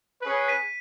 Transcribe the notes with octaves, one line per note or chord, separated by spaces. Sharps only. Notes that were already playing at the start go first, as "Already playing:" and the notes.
C#4 G#4 B4
B6 D#7